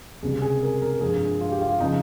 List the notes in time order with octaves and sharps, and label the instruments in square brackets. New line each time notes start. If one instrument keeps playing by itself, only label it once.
[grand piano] C#2 C3 G3 G#4
G#4
A#4
A#4
G2 F3 G#3 G#4
F4
G4
F4
C#3 F3 D#4